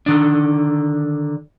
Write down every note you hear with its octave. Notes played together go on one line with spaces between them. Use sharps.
D3 D#3 D4